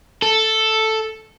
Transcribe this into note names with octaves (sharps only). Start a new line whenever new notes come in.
A4